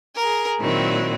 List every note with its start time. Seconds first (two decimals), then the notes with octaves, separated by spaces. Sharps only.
0.16 G#4 A#4
0.60 A#2 D#3 F#3 C4 E4